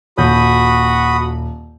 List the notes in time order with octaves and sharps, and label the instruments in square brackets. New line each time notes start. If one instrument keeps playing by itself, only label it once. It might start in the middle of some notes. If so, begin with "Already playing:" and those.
[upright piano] D#1 G6 [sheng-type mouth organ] F#4 B5 D#6